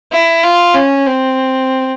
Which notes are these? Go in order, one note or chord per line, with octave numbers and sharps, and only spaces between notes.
E4
F4
C#4
C4